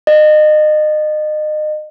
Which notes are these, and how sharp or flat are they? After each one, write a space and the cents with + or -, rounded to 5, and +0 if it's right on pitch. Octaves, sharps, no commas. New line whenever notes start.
D#5 -30